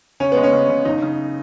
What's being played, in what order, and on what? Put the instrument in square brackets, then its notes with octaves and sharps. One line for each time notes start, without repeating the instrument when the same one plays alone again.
[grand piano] C#3 [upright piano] C#4
[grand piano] G#3 [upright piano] B3
[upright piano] C#4
[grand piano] C#3
C#3
[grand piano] F#1 [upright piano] D#4
[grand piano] C#3